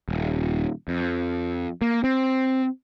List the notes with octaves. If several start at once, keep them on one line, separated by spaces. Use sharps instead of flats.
D#1
F2
A#3
C4